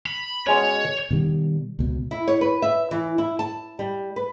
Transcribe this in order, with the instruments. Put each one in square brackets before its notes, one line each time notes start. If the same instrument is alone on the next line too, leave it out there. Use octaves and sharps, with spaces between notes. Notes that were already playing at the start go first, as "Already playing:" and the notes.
[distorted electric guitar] B5
[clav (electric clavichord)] B2 G#3 C#4 [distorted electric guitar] C#5
[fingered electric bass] B2 D#3 G3
C#2 B2
[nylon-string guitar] E4
C#5
B4
E5
E3
E4
A5
G3
B4